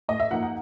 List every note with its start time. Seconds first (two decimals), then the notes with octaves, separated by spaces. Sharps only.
0.09 A2 D#5
0.20 E5
0.31 F3 A#3 D#4 F#5
0.43 F#5